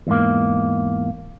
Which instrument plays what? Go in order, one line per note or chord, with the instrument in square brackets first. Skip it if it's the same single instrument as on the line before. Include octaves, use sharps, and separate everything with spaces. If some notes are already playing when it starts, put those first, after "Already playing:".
[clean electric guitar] E2 G#2 A#3